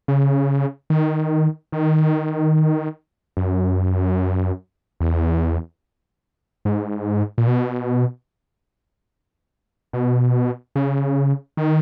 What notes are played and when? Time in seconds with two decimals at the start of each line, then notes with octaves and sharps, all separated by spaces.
0.08 C#3
0.90 D#3
1.72 D#3
3.37 F#2
5.00 E2
6.65 G#2
7.38 A#2
7.47 B2
9.93 B2
10.76 C#3
11.57 D#3